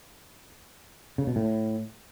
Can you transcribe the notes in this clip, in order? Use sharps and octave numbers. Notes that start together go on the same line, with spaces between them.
C#3
B2
A2